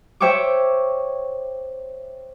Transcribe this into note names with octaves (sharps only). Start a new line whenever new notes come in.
C5 C#5 E5 G5 C#6 D6